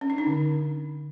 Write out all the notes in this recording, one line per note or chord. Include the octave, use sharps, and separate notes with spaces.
C#4
D4
D#4
D3